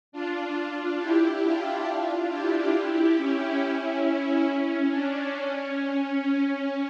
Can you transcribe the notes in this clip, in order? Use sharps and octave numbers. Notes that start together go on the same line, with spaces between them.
D4 F4
E4 G4
D4 F4
D4 F4
E4 G4
C#4 E4
C#4 E4
C#4
C#4
D4
C#4